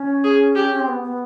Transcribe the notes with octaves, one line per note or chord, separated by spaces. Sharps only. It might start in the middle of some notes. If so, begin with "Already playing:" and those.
Already playing: C#4
G#4
G4
C#4
C4
B3
B3